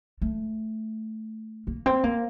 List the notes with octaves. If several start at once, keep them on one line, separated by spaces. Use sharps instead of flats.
A3
A#3
C4
A#3